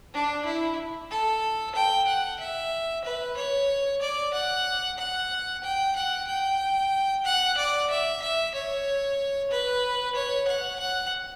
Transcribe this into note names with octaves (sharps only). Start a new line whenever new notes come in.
D4
E4
A4
G5
F#5
E5
B4
C#5
D5
F#5
F#5
G5
F#5
G5
F#5
D5
E5
E5
C#5
B4
C#5
F#5
F#5